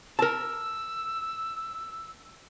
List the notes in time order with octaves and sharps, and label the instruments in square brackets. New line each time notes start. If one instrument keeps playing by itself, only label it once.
[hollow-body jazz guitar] A#4 A5 [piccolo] E6